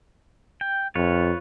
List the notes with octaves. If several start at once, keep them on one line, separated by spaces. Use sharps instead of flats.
G5
F2 F4 B4 C#5